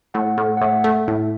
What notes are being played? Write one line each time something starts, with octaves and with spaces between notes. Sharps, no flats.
A2 F#5
A2
F#5
A2 E5
A3
A2